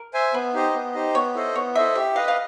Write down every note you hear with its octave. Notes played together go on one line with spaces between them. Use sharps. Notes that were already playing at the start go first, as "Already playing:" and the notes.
Already playing: A#4
C5 E5 G#5
B3 B4
D#4 G4 C5 D#5
B3
D#4 G4 C5 D#5
B3 C#5
E4 A4 C5 D#5
B3 C#5
E4 A4 C5 D#5 E5
G4 E5
B4 D#5 F5
F5